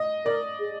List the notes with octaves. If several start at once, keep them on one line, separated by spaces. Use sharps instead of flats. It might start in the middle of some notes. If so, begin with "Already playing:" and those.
Already playing: D#5
A#4 D5
G#4